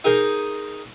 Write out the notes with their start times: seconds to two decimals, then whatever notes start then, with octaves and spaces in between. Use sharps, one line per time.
0.04 D#4 G#4 A#4 C5